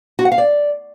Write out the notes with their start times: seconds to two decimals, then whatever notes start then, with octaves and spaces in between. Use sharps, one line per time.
0.19 F#4
0.25 F#5
0.32 F5
0.38 D5